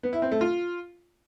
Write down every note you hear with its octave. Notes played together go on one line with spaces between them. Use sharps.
B3
E4
C4
A3
F4